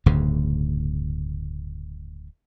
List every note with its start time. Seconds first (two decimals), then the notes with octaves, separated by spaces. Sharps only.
0.06 D1 D2 G2 C#3